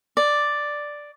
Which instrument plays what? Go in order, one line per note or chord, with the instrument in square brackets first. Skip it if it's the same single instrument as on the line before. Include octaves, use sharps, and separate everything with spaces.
[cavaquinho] D5